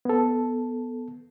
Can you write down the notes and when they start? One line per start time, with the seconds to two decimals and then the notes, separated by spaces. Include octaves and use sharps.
0.05 B3 A4